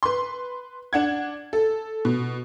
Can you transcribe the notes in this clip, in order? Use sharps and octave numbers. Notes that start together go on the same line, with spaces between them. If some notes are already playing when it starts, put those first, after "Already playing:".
B4 C6
D4 F#5 G#6
A4
B2